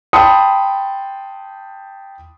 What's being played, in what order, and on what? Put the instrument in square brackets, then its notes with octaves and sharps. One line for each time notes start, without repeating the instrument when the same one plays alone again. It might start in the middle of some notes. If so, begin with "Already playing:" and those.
[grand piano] G5 A5 B5 C6 D#6 C#7